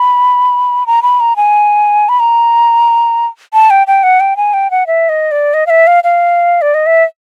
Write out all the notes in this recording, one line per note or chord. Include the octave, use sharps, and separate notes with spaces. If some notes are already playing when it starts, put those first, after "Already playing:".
Already playing: B5
A#5
B5
A#5
G#5
B5
A#5
A5
G5
G5
F#5
G5
G#5
G5
F#5
E5
D#5
D5
D#5
F5
E5
F5
F5
D5
D#5
E5